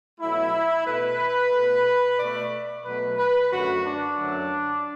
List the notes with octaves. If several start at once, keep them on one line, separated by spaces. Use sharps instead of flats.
B2 F#3 A3 E4
B2 A3 B4
B2 A3
B2 A3 D5
B2 F#3 A3 B4
B4
F#2 D3 A3 F#4
D4
F#2 D3 F#3 A3